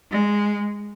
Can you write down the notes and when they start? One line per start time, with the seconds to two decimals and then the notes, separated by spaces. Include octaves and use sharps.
0.11 G#3